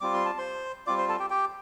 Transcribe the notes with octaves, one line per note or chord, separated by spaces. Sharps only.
G3 C4 F4 D6
C6
A5
C5 C6
G3 C4 F4 D5 D6
C5 C6
A4 A5
G4 G5
G4 G5